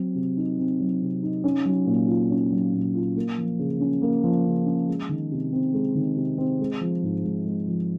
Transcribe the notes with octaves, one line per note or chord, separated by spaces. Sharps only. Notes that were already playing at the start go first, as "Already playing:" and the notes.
Already playing: F#3 C4
C3
D#4
C4
F#3
C3
D#4
C#4
F#3
A#2
F4
C#4
F#3
A#2
F4
A#3
F3
C#3
C#4
A#3
F3
C#3
C#4
G#3
D#3
C3
C4
G#3
D#3
C3
C4
G#3
F3
G#2
G#2
G#3
F3